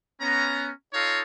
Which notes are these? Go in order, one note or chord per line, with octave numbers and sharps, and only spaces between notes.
B3 C#4 A#5
D#4 F4 A4 C#5 D#5 F5